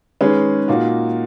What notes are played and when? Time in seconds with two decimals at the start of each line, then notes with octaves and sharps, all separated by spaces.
0.21 D#3 G#3 C#4 G#4 B4
0.68 A#2 A#3 D#4 F#4